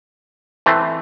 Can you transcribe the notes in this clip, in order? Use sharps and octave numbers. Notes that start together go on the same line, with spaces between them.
E3 A3 C4